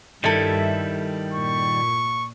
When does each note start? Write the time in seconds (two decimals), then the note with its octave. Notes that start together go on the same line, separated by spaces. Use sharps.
0.24 G2 D#3 G3 E4 A4 E5
1.33 A#2 C#6